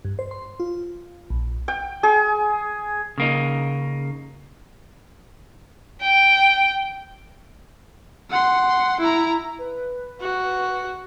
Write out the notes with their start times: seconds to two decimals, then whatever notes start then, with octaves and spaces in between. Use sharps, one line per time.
0.05 G2
0.19 C5
0.31 C6
0.60 F4
1.30 A#1
1.68 G5
2.03 G#4
3.18 C#3 A#3 D#4
6.01 G5
8.30 F#5 C6
9.00 E4 A#5
9.59 B4
10.21 F#4